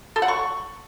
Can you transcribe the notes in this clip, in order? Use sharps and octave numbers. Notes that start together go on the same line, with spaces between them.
A4
F#5
C#6